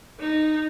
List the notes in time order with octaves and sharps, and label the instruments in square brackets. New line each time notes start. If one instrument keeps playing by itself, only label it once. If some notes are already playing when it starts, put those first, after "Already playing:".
[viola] D#4